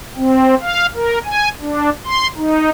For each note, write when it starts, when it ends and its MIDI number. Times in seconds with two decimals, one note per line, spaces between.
0.17 0.55 60
0.61 0.86 77
0.95 1.18 70
1.25 1.49 80
1.60 1.90 62
2.05 2.27 84
2.37 2.70 63